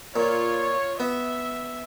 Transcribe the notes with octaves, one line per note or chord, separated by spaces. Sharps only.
A#2 F4 C#5
B3 E5